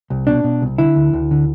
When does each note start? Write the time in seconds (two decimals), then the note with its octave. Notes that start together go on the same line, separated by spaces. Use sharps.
0.10 C2
0.27 B2 D4
0.44 B2
0.62 C2
0.78 D3 E4
0.96 D2
1.13 D2
1.31 D3